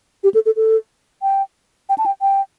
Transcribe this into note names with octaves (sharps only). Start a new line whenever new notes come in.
G4
A4
A4
A4
G5
G5
A5
G5
G5